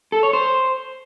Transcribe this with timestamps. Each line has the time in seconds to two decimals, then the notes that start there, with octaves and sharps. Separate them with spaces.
0.12 A4
0.23 C#5
0.33 C5